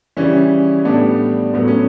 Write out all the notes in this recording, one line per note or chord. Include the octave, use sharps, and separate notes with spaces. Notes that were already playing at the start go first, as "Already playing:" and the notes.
C#3 E3 G3 C#4 E4
A2 G3 B3 D4
A2 F#3 B3
C#4